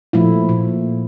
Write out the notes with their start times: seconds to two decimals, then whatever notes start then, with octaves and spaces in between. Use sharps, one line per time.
0.13 A#2 F3 A3 E4
0.49 A#2